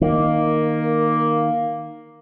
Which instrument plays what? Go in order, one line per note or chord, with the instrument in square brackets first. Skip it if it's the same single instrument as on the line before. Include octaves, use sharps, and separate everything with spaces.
[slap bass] D#3 [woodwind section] A#3